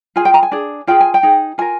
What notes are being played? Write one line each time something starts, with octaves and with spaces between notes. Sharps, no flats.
F4 G#4 G#5
G5
A#5
G#5
D4 G#4
F4 G#4 G5
G#5
G5
D#4 G#4
F4 A#4 G#5